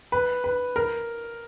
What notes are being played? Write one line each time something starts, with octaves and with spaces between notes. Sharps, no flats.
B4
B4
A#4